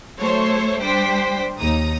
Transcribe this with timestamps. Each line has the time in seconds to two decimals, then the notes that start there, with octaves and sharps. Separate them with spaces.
0.19 F#3 A3 A4 C5 C#5
0.80 G3 D4 C5 G5 B6
1.58 D#2 D#4 A#5 D#6